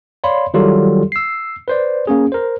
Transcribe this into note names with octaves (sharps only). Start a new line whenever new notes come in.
C#5 D5 F5 B5 C6
D#3 F#3 G3 F4 G4 A4
E6 C7
B4 C5 D5
A#3 C#4 G#4
A#4 C5